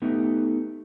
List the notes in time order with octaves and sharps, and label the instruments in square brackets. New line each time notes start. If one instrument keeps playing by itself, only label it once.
[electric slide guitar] A3 B3 D#4 G4